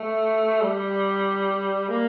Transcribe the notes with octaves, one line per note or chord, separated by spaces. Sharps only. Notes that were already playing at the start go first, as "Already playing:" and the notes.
Already playing: A3
G3
A#3